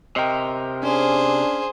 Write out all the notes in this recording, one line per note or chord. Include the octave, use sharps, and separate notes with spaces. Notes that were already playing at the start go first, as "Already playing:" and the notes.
C3 A#4 D#5 G5
C#4 D4 G#4 C5